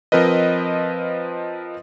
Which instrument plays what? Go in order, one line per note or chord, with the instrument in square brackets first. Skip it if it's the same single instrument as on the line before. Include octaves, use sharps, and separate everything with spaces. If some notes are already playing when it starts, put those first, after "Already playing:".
[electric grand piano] F3 C4 A#4 B4 D#5